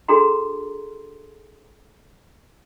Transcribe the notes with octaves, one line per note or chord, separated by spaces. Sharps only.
D4 F#4 G#4 A4 A#5 C6